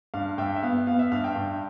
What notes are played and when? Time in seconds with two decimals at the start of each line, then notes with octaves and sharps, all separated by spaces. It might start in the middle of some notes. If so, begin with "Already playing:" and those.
0.14 G2 F5
0.38 G2 E5 G5
0.56 E5
0.63 B3 F5
0.87 B3 F5
0.99 E5
1.12 G2 F5
1.24 E5 G5
1.36 G2